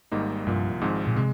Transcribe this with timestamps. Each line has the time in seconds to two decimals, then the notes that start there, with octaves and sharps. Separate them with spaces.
0.12 G#1 G#2 G3 A#3 D#4
0.46 C2 G2 A#2 F3
0.81 G#1 G#2 F3 G#3 C4
1.07 A#2
1.16 C3 G#3